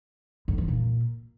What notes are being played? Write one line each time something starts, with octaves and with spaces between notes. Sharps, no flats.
F2
E3
A#2